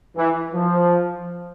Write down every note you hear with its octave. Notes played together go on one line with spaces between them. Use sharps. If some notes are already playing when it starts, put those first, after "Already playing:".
E3
F3